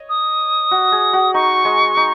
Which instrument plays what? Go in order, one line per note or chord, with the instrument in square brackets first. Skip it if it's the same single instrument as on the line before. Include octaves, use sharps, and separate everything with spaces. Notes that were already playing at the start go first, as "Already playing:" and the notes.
Already playing: [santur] C#5 D#5
[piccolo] D#6
[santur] F#4
G#4
F#4
[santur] D#4 [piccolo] C#6
[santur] G#3
D#4